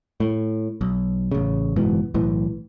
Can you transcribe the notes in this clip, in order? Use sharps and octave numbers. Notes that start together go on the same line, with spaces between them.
A2
B1
A1 C#3
F#1 G#2 B2 E3
B1 A2 E3